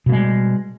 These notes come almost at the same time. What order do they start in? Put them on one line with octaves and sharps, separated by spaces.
B2 A#3 G#3 G3